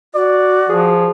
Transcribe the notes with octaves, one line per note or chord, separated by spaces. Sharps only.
F#4 D5
F3 G#4